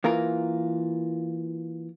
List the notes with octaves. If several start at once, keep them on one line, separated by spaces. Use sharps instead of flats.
E3 A#3 F4 A#4